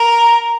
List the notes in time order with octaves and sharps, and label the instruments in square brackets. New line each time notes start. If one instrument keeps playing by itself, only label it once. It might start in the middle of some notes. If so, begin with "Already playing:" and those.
Already playing: [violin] A#4